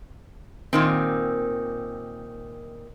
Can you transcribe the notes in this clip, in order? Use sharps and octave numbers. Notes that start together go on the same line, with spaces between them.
A#2 D#3 C4